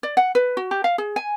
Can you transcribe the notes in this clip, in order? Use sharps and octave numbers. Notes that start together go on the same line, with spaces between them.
D5
F#5
B4
F#4
G4
F5
G#4
G#5